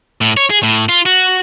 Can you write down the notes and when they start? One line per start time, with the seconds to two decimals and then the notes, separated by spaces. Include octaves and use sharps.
0.21 A2
0.37 C#5
0.50 G#4
0.63 A2
0.89 F4
1.06 F#4